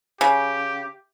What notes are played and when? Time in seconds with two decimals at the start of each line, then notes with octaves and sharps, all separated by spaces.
0.21 C#3 G4